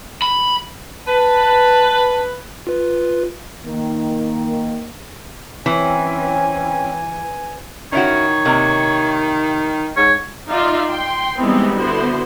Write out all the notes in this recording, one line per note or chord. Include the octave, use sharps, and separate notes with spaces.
B5
B4 A5
F4 B4
D#3 A#3
E3 C4 C#4 G#5
D#3 C#4 E4 F#4 C#5
C3 A#3 D#4
G#2 C#5
D#4 F4 D5 E5 F5
G5 C6
E3 G3 G#3 B3 C4 D#4
D3 B3 E4 F#4 C5